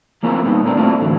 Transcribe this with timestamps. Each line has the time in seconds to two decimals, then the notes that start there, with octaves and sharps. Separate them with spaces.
0.23 F3 A#3 C4 E4 F4
0.45 A#2 G3 B3 D#4
0.63 A#2 A3 A#3 C4 D4
0.77 F#3 A3 C4 D4 E4 F4
1.00 A2 D3 E3 F#3